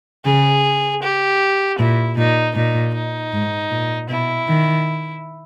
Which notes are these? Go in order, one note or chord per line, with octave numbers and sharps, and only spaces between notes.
C#3 G#4
G4
A#2 E4
A#2 D#4
A#2 D#4
D#4
G#2
A#2
B2 E4
D#3